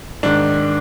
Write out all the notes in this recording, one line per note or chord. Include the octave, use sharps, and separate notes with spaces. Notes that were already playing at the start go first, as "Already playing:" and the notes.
G#2 D#3 D4